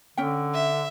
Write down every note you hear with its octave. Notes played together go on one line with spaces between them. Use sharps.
D3 C#4 G5
E5